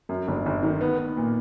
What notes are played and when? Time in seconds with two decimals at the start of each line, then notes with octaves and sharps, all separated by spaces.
0.09 F#2
0.28 G1
0.46 G1
0.63 D#3
0.81 B3
0.98 B3
1.17 A#2